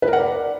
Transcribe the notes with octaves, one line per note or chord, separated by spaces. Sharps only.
B4
A#4
F#5
D5